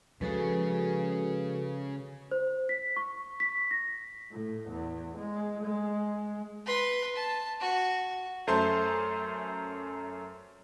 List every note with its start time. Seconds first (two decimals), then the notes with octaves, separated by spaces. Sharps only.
0.21 C#3 F3 G#3 F#4 G#4 A4 B4
2.31 C5
2.69 B6
2.96 C#6
3.40 B6
3.71 A#6
4.31 A2
4.69 E2
5.17 G#3
5.63 G#3
6.66 B4 C6
7.16 A5
7.60 F#4
8.47 F#2 A3 C5 A5 C6